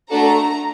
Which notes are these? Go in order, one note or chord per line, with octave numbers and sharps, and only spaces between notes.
A3 D4 F#4 A4 A#5